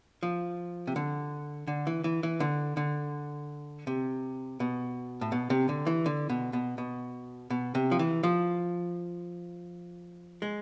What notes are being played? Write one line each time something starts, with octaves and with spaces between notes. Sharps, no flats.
F3
C3
D3
D3
E3
E3
E3
D3
D3
C3
B2
A2
B2
C3
D3
E3
D3
B2
B2
B2
B2
C3
F3
E3
F3
G#3